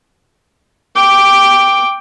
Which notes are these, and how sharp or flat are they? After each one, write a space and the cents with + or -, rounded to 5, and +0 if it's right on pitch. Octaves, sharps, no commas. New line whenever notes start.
G5 +5 D6 +0